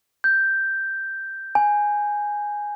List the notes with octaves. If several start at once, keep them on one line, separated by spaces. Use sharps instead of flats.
G6
G#5